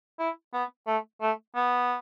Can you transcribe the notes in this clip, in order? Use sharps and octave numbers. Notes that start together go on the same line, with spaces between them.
E4
B3
A3
A3
B3